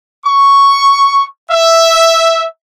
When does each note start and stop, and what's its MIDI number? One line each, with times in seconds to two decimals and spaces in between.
0.25 1.25 85
1.50 2.46 76